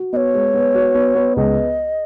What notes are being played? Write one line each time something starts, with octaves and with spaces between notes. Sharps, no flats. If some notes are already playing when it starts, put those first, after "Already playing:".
Already playing: F#4
B3 C#5 D#5
G#3
B3
F#4
B3
B3
C#2 D#5